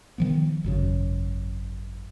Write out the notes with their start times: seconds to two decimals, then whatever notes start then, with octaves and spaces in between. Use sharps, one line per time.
0.18 D#3 F3 B3
0.64 G#1 F#2 C#3